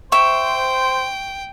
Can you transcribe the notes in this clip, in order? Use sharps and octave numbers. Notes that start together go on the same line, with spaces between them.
C5 E5 G5 C#6